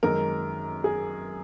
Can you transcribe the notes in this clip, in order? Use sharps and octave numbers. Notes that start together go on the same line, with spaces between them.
F#2 D#3 G#3 A#4
G#4